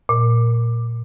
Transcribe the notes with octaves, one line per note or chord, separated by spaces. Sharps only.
A#2